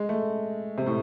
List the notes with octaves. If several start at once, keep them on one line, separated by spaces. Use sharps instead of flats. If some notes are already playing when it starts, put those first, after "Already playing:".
Already playing: G#3
A3
C3
A2